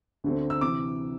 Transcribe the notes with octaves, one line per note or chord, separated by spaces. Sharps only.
D2 D3 C4
E6
C3 E3 D6